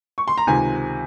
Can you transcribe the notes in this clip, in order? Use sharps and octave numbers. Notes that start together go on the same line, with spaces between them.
C#6
C6
A#5
C#2 C3 D#3 G#5